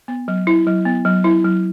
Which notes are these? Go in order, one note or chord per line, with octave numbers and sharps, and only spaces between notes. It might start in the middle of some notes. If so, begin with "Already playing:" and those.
B3
F#3
E4
F#3
B3
F#3
E4
F#3